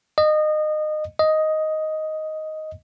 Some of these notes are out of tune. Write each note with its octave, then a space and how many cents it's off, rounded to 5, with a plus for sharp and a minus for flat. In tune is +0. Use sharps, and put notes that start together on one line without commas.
D#5 -25
D#5 +5